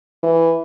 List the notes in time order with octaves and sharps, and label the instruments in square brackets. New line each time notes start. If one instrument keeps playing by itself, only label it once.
[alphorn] E3